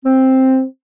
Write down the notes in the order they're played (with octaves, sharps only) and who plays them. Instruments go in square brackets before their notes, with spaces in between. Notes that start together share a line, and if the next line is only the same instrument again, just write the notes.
[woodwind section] C4